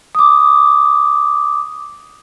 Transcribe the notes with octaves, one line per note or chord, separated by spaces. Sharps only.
D6 D#6